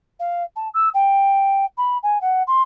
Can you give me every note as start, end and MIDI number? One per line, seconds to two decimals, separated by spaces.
0.20 0.43 77
0.56 0.68 81
0.74 0.89 88
0.94 1.65 79
1.78 1.98 83
2.03 2.21 80
2.21 2.43 78
2.47 2.62 84